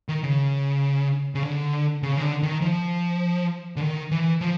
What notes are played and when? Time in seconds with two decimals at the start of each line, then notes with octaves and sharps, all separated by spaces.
0.09 D#3
0.23 C#3
1.35 C#3
1.43 D3
2.03 C#3
2.17 D#3
2.22 D3
2.43 D#3
2.62 F3
3.76 D3
3.81 D#3
4.11 E3
4.41 F3